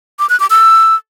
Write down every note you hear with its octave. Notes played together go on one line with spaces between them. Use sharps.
D6
F#6
D6
E6